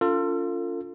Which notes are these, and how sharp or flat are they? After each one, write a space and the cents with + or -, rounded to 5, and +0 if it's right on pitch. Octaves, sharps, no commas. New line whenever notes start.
C#4 +40 F4 +0 A4 +35